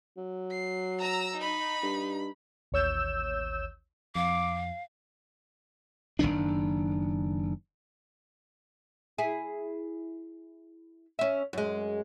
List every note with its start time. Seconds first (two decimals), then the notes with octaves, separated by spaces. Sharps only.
0.17 F#3
0.51 C7
1.01 A#5 E6
1.40 D#4 B5
1.83 G2
2.72 A1 D#2 C#5 E6 G6 E7
4.15 F2 F5 D6
6.19 F#1 C#2 D#3 D4
9.18 E4 G#4
11.19 C#4 E5
11.53 F#2 G#3